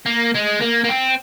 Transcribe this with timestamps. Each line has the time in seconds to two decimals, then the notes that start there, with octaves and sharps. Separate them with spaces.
0.06 A#3
0.34 G#3
0.61 A#3
0.84 A#3
0.89 C4